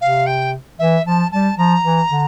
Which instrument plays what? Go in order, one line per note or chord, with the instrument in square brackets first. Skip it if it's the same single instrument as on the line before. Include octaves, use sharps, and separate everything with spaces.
[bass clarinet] C3 [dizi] F5
[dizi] G5
[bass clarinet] E3 [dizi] E5
[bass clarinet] F3 [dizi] A5
[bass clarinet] G3 [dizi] A5
[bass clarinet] F3 [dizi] A#5
[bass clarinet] E3
D3